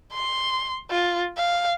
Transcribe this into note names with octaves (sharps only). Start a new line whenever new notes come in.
C6
F4
F5